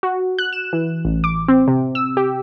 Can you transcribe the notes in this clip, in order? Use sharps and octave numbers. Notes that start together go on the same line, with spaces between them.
F#4
F#6
E7
E3
A1
D6
C4
C3
E6
G4